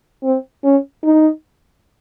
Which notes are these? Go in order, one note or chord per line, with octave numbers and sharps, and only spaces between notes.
C4
C#4
D#4